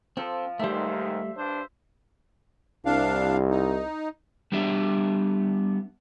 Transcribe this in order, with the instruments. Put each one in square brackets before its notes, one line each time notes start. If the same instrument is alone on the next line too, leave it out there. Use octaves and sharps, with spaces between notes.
[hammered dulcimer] F3 [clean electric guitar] C4 A4
[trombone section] D#2 G#2 D#3 [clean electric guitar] G3 A3 [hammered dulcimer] C5 E5
[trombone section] G2 D4 C5
[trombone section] C2 [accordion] D4 F5
[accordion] D#4
[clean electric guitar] G3 B3 D4 G4 E5